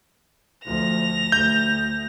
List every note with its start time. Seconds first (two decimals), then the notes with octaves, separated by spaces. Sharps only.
0.65 D2 F3 A#6 F7
1.32 D2 G6